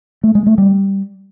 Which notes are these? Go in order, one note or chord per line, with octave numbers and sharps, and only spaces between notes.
A3
G#3
A3
G3